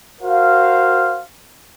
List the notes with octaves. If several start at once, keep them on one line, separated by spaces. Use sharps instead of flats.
F#4 A#4 C5 F5